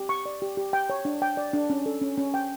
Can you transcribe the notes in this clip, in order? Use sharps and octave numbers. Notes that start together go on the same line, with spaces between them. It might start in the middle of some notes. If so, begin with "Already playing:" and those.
Already playing: G4
C#6
D5
G4
G4
G5
C#5
D4
G5
D5
D4
C#4
A4
C#4
C#4
G5